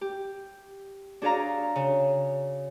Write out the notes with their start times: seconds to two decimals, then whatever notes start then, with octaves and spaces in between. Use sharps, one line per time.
0.01 G4
1.22 D4 F#4 G#4 D5 F5 A#5
1.76 C#3